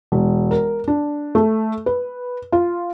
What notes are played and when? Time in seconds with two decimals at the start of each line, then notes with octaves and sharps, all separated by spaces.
0.12 E1
0.51 A#4
0.88 D4
1.35 A3
1.86 B4
2.52 F4